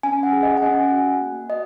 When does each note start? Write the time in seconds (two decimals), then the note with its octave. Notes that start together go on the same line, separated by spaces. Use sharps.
0.03 C#4 G#5
0.23 F#5
0.33 G#4
0.43 D#5
0.57 G#5
0.62 C#4 F#5
0.92 F#4
1.21 A#3
1.50 F#4 D#5